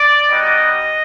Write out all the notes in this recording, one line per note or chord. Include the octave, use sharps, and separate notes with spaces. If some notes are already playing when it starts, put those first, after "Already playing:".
Already playing: D5
G3 B3 D#4 F#4 D#5